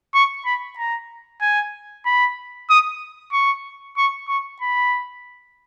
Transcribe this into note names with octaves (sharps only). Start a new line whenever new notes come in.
C#6
B5
A#5
G#5
B5
D#6
C#6
C#6
C#6
B5